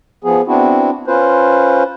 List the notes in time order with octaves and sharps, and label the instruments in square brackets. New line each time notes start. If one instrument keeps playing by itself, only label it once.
[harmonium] F3 B3 G#4
B3 C4 D4 E4 F#4
C#4 F4 B4 C5